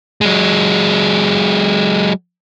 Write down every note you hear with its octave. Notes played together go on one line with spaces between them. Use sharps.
F#3 G#3